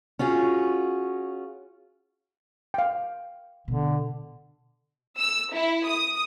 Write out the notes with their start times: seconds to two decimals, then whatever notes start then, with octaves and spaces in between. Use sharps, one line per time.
0.19 C#4 F4 F#4 G#4
2.74 F5 G5
3.68 B2 D3 B3
5.19 E6
5.54 E4
5.88 D#6